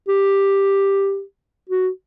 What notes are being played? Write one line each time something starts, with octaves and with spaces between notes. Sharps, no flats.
G4
F#4